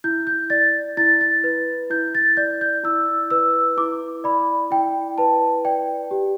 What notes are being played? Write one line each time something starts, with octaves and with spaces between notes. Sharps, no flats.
E4 G6
G6
D5 A6
E4 A6
A6
B4
E4 G6
A6
D5 G6
G6
E4 E6
B4 E6
E4 D6
D5 B5
E4 G5
B4 A5
D5 G5
G4